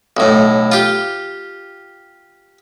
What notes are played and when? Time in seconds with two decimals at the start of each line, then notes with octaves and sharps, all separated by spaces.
0.17 B1 A2
0.72 F4 G4